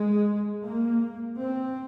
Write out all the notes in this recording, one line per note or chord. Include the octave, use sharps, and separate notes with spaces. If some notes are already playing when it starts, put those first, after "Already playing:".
Already playing: G#3
A#3
C4